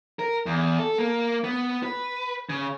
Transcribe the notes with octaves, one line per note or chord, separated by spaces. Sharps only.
A#4
E2
A4
A#3
B3
B4
C#3